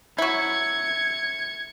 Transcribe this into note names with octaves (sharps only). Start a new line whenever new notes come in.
F#3 E4 G#6 C#7